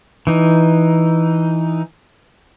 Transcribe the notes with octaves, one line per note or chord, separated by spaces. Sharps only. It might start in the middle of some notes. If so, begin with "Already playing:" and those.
E3 D#4